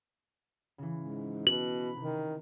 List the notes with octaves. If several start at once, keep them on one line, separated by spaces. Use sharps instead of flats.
C#3 E3
G#2
B2 F#7
B4
C3 D#3